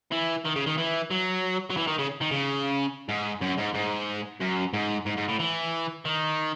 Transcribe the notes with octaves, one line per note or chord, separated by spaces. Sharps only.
E3
D#3
C#3
D#3
E3
F#3
F#3
E3
D#3
C#3
D#3
C#3
G#2
F#2
G#2
G#2
F#2
G#2
G#2
G#2
A2
E3
D#3